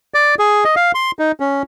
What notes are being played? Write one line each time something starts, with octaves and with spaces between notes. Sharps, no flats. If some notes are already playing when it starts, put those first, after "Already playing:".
D5
G#4
D#5
F5
C6
D#4
C#4